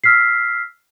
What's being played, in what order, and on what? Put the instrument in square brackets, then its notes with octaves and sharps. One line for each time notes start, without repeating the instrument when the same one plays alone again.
[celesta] E6 F6 B6 C7